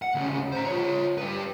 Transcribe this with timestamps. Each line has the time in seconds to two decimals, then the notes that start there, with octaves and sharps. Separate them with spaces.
0.02 F#5
0.15 D2 C#3
0.52 C5 A#5
0.66 F4 C#5
1.18 G3 B4